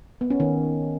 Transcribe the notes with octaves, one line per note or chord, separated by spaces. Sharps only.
B3
C#4
D#3